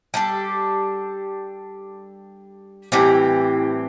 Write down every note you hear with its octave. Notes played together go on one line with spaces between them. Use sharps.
G3 D4 A4
A2 E3 G3 C4